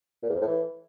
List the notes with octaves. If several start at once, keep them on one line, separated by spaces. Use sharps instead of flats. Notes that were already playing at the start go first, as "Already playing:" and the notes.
A#2
E2
F2
A2
E3